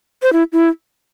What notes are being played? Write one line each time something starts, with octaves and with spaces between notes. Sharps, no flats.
C5
E4
E4